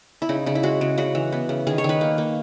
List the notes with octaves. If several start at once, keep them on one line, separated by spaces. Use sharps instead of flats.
E4
C#3 D#4
C#3 D#4
E4
G#3 F#4
C#3
C#3 F#4
E3
B3
C#3
D#3 G#4
C#5
D#3 B4
A#3
A#3